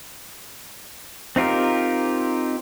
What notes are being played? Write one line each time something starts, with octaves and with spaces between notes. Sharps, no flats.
C4 D#4 F4 G4 A#4